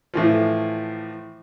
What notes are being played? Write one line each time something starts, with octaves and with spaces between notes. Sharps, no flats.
A2 E3 F3